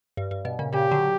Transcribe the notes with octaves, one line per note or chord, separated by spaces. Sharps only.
G2
G2
G2 B2
A#2 C#3
A#2 C#3 G4
D3 F#3